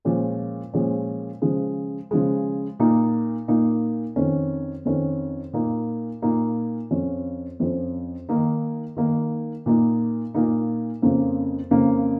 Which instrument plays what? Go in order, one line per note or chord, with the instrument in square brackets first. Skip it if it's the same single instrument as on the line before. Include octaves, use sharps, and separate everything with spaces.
[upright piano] A#2 F3 G#3 C#4
A#2 F3 G#3 C#4
C#3 F3 G#3
C#3 F3 G#3
A#2 A#3 D#4
A#2 A#3 D#4
F2 D#3 C#4
F2 D#3 C#4
A#2 A#3 D#4
A#2 A#3 D#4
F2 F3 C#4
F2 F3 C#4
D#3 A#3 D#4
D#3 A#3 D#4
A#2 A#3 D#4
A#2 A#3 D#4
F2 C#3 A#3
F2 C#3 A#3